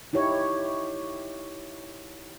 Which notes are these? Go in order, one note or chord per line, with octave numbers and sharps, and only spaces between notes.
D#4 E4 G4 C#5